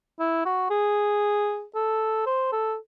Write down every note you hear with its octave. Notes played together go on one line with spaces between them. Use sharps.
E4
F#4
G#4
A4
C5
A4